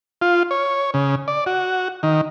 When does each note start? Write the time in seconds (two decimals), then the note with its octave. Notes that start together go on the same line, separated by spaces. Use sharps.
0.21 F4
0.51 C#5
0.94 C#3
1.28 D5
1.46 F#4
2.03 D#3